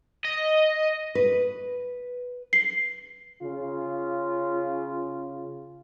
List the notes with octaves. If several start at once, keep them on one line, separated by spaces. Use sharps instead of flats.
D#5
B4
C7
C#3 F4